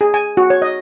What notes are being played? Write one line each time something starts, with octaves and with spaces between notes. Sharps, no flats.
G#4
G#5
F#4
C#5
D#5